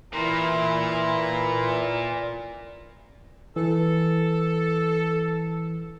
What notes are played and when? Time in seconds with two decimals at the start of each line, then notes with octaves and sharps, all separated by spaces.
0.13 A#2 E3 E4 A#5
3.56 E3 A4